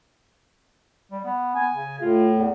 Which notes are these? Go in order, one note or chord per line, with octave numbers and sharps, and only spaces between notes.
G3
B3
B3 G#5
C#3
A2 F4
E2